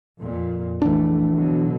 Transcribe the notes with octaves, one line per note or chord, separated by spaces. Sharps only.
F2 A#2
A#1 E3 A3 D4
B2 D3 F#3